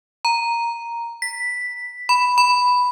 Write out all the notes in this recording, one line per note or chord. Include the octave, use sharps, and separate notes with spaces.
A#5
B6
B5
B5